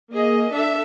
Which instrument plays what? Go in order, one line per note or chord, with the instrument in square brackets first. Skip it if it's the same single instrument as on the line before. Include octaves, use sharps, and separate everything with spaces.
[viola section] A#3 G#4 D#5
D4 A4 E5